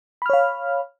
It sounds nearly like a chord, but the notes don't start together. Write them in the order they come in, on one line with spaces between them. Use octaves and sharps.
B5 F6 C#5 F5